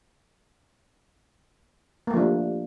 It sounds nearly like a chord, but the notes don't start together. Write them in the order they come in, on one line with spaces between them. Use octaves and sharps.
A#3 A3 F3 D4 G3